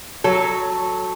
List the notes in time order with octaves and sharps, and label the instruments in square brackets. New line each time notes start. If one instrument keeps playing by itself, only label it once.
[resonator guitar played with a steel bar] F#3 A4